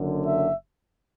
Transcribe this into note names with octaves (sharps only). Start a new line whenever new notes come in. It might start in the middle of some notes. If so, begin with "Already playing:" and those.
Already playing: F#1 F#2 D3
E5